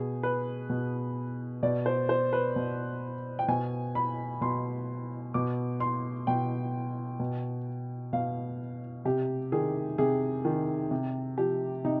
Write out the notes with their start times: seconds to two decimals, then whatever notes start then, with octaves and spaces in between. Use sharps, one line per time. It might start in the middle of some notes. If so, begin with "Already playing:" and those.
Already playing: B2 G#4
0.23 B4
0.70 B2
1.63 B2 D5
1.86 C5
2.09 C5
2.33 B4
2.56 B2
3.39 G5
3.48 B2 G#5
3.95 B5
4.41 B2 C6
5.34 B2 D6
5.80 C6
6.27 B2 G5
7.20 B2
8.13 B2 F5
9.05 C3 G4
9.52 D#3 G#4
9.98 C3 G#4
10.45 D#3
10.91 C3
11.38 F3 G4
11.84 C3 D#4